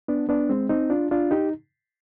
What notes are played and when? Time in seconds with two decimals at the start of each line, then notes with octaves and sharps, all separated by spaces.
0.08 B3 D4
0.29 B3 D4
0.50 G#3 C4
0.69 C4 D#4
0.90 D4 F4
1.11 D4 F4
1.31 D#4 G4